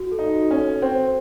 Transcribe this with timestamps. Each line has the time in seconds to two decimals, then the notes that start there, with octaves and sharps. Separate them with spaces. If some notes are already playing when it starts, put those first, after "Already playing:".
Already playing: F#4
0.12 A4
0.19 D#4
0.35 F#4
0.51 C#4
0.58 A4
0.82 C4 C5